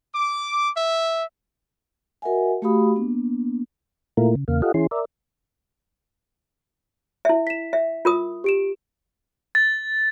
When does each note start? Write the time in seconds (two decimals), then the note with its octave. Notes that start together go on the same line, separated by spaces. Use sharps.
0.15 D6
0.77 E5
2.22 F#4 A#4 D#5 E5 F#5 G#5
2.62 A3 F#4 G4 F5 B5 D#6
2.96 A#3 B3 D4
4.17 A#2 A3 A#3 E4 F4 A#4
4.35 C#3
4.48 E2 C#3 A#3 F5
4.62 F4 G4 A4 D#5 F5 F#5
4.74 E3 C#4 E4 G#4 C6
4.91 A#4 D5 E5
7.25 E4 E5
7.47 B6 E7
7.73 E5
8.05 F4 A#4 D#6
8.44 G4 D7 E7
9.55 A6